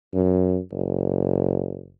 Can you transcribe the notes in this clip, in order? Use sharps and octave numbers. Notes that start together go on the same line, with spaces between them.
F#2
F#1